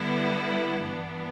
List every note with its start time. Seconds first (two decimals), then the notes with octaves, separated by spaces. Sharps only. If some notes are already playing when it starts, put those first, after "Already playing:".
Already playing: D3 G3 B3 E4
0.83 G2 E3 B3 D4